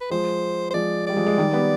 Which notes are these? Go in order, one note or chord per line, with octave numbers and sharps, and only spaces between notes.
B4
F3 G#3 C5
C5
F3 G#3 D5
G3 D5
F3 G#3
G#3
D#3 G3
G3 B3